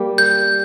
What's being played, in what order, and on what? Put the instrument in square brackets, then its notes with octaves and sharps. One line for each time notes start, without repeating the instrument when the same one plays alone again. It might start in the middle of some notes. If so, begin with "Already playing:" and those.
Already playing: [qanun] G3 A#3
[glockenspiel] G6